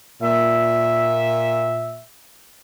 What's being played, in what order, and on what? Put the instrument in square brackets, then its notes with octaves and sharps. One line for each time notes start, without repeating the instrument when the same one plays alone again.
[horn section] A#2 E5